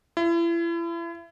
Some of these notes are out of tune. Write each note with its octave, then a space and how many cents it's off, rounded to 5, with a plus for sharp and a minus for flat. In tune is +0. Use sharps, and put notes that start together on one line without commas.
E4 +35